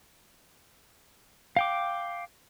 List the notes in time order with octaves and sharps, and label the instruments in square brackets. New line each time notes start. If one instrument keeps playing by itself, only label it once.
[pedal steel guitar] F5 G5 D6